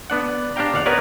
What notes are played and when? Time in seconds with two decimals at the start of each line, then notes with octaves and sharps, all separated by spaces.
0.10 B3 D4 F#5
0.56 D4 G4 F5 G5 A#5
0.74 D#2 F5 F#5
0.86 B3 D#4 A#4 B4 C#5 D5